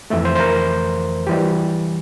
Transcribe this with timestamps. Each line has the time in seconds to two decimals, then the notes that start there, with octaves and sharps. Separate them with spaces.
0.10 F2 E3 A3 E5
0.25 C5
0.35 C5
0.39 A#4
1.27 E3 G3 G4